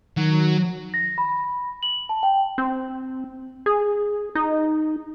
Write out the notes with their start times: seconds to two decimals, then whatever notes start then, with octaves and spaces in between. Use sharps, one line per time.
0.17 D#3 F#3
0.94 A#6
1.18 B5
1.83 F#7
2.09 A5
2.23 G5
2.58 C4
3.66 G#4
4.35 D#4